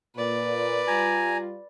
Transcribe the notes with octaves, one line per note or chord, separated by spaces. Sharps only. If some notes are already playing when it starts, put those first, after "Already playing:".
A#2 B4 D5
G3 F4 G#5 A#5